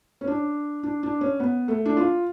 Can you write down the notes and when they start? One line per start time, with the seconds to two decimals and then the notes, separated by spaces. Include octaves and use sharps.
0.21 C#4
0.27 D4
0.83 D4
1.03 D4
1.21 C#4
1.40 B3
1.68 A3
1.86 D4
1.97 F4